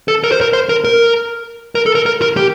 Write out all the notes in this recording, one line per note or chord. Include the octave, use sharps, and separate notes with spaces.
A4
A#4
C5
A#4
C5
A#4
A#4
A#4
A4
A#4
A#4
A#4
G4